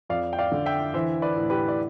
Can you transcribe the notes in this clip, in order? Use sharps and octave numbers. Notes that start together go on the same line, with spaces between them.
F2 D5 F5
G5
D5 F5
D3
E5 G5
E3 C5 E5
B4 D5
A2
G4 B4
D5